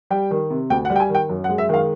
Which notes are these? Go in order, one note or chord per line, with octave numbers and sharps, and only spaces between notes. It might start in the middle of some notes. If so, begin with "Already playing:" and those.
G3 G5
D#3
C3
D2 G5
F#5
G3
G5
G#5
D#3
G5
F#2
F#5
G#3
E5
D#3 F5